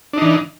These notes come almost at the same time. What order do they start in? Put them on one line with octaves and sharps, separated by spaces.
D4 D#4 E3